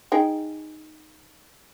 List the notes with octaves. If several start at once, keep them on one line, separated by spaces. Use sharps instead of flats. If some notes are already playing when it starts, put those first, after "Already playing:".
D#4 G#4 G5